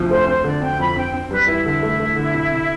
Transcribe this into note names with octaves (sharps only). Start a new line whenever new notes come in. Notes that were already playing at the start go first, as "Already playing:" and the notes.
Already playing: D2 C3 F3
A3 C5
C4 C5
D3 D5
C4 G5
F2 B5
C4 G5
C4
G3 B4
E3 E4
D3 E4
A3
A3
D3
C3
C3